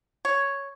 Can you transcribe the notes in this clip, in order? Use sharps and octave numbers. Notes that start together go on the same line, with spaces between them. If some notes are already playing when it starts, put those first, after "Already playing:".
C#5